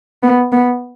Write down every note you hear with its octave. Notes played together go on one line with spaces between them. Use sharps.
B3
B3